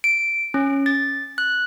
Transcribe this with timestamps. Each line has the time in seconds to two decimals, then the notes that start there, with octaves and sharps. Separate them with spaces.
0.04 D7
0.54 C#4
0.86 A6
1.38 F#6